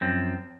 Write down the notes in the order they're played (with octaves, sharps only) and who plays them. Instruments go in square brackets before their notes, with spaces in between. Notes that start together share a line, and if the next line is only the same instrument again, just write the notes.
[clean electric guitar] F#2 F3 C4